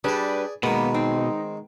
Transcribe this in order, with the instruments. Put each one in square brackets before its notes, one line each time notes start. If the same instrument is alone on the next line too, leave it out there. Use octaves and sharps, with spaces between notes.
[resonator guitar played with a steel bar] G3 D4 [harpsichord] G#4 D5 [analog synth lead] B4
[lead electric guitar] B2 [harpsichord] D#3 G#3 [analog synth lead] A#3 [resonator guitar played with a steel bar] B3
[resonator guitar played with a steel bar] C4 [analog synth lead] D#4